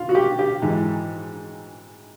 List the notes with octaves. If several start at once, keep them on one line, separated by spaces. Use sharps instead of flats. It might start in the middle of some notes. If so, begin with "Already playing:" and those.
Already playing: F4
F#4
G4
G4
G#2 E3